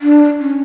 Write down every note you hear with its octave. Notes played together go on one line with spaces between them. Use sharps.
D4
C#4